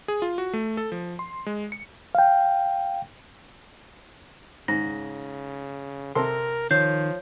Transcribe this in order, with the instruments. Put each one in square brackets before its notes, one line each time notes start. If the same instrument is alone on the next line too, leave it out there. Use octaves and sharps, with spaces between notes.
[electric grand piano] G#4
F4
F#4
A3
A4
F3
C6
G#3
C#7
[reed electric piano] F5 G5
[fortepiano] G#2 [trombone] C#3 [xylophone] A#6
[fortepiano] C3 A4 C6 [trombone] A#4
[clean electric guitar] D#3 [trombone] F3 [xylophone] C#5 G6 C7